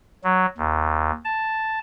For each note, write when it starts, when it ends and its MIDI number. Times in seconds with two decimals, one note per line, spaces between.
0.24 0.46 54
0.58 1.11 39
1.25 1.79 81